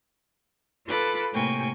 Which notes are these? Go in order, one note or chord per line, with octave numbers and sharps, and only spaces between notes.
F4 A4 B4 B5 D6
A2 C3 A#3 G5 G#5 C#6